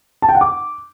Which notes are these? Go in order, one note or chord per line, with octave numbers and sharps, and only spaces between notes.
A5
G5
F#5
D6